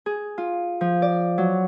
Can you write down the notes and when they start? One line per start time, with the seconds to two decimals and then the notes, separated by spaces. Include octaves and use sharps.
0.06 G#4
0.38 F4
0.81 F3
1.02 D5
1.38 F#3